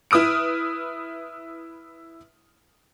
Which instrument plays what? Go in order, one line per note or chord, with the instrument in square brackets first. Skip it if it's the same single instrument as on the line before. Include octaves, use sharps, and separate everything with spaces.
[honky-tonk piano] E4 B4 D#6 F6 D7